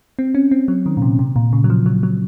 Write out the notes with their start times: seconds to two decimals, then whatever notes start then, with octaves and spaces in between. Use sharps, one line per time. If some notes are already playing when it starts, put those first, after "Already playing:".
0.19 C4
0.35 C#4
0.51 C4
0.68 F#3
0.86 D#3
0.97 A#2
1.02 C3
1.19 C3
1.36 A#2
1.53 C#3
1.64 F#3
1.70 F3
1.86 F#3
2.03 F#3